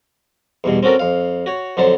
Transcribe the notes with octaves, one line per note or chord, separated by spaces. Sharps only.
E2 G2 B2
C4 C#4 F#4 A4 A#4
F2 F5
F#4 C#5
F2 D3 F#3 C5 A5